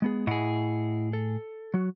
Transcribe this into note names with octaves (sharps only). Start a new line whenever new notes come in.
G#3 B3 G#4
A2 E4 G#4 D#5 F#5
A4
F#3 F#4